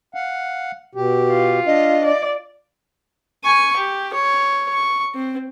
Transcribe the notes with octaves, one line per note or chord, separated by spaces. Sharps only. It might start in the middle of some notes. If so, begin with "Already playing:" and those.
F5 F#5
B2 G4
F4
D4 D#5
D5
G#5 C#6
G4
C#5
C#6
C4